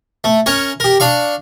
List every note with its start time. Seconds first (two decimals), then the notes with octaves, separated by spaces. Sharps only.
0.24 A3
0.46 C#4 A#4 C#5
0.80 G4 A#4
1.00 D4 F5 C#6